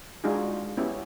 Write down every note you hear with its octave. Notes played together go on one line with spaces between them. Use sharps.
G#3 D4 D#4 F4 F#4 G#4
B3 C#4 E4 G4